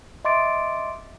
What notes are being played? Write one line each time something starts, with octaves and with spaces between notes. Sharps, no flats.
D#5 E5 C6 D6 A6 D7